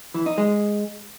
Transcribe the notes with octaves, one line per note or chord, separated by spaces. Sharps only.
E3
D#4
G#3